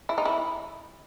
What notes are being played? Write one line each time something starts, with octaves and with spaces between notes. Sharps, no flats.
E4
D#4
E4